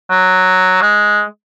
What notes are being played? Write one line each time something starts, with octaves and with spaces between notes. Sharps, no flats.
F#3
G#3